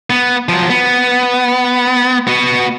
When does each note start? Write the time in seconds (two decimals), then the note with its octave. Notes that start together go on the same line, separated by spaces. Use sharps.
0.10 B3
0.49 F3 F#3
0.70 B3
2.27 B3 F#4